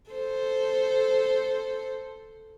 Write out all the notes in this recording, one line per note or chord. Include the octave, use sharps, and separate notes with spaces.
A4 C5